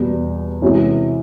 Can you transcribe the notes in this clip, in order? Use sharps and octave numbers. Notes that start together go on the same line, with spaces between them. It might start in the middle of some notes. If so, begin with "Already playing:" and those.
Already playing: E2 B2 G3
C3 E3 G#3 C#4 F#4